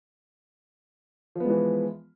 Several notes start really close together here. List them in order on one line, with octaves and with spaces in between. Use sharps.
F3 B3 G#3 E3